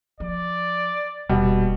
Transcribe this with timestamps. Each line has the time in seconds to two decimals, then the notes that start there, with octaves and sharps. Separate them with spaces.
0.20 F3 D5
1.29 D#1 E2 B2 G3